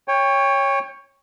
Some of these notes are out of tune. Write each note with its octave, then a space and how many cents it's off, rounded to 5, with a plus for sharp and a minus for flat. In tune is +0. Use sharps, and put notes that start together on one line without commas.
C#5 +0 G5 +30